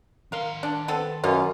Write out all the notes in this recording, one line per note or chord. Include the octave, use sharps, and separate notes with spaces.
D#3 A#4 F5 C6
D4
B3 C4 A4
F#2 B2 C#4 F4